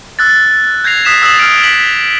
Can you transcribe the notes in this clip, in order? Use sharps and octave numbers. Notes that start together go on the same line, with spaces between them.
E6 F#6 A6
G6 G#6 A#6 C7 F7
D#6 F#6 B6 C7 E7
D#6 E6 A6 C7 E7 F#7
F6 D7
B6 F#7